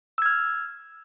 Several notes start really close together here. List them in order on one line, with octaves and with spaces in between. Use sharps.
E6 G#6 F6